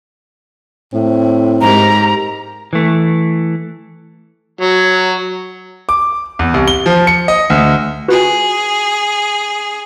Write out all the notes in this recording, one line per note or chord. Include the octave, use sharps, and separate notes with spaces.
A2 C4
G#2 G4 A#4 A#5
E3 A3
F#3
D6
E2
C2
G7
F3
C#7
D#5
D2
F4 F#4 G#4 B4